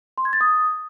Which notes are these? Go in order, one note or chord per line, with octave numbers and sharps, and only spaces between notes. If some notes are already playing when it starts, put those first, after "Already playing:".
C6
G#6
A6
D#6